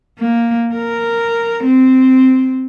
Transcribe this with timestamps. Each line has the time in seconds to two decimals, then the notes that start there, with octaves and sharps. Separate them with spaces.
0.19 A#3
0.75 A#4
1.66 C4